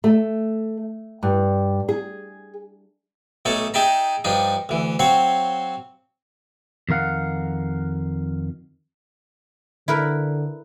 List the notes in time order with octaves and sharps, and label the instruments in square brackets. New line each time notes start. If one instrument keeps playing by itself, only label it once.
[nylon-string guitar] A3
G2
G#4
[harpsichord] B1 A3 D#4 C#5 A5
D#4 G#4 E5 G5 A5 A#5
G2 F3 D4 D#4
D2 E3
F#3 C4 C5 C#5 F5
[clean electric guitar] F2 D#3 A#4 F5 F#5
[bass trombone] D3 [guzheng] E4 A#4 B4